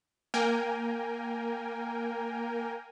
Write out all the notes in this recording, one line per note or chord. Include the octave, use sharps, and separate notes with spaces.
A#3 A#4 G5 G#5